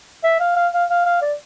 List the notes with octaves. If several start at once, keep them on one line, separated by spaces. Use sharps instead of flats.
E5
F5
F5
F5
F5
F5
D5